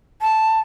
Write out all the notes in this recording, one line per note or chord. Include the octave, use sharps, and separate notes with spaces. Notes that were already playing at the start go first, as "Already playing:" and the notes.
A5